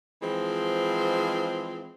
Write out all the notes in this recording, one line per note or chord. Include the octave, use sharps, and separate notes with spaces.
E3 F3 G#3 C4